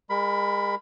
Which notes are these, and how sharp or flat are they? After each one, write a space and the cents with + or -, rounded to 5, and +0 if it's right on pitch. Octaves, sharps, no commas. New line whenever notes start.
G#3 -40 A#4 +0 B5 +15